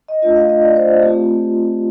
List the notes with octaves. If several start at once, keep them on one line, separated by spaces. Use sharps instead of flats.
D#5
A3 D4 F4 D#5
F5
D#5
D5
C5
A3 C4 F4 G4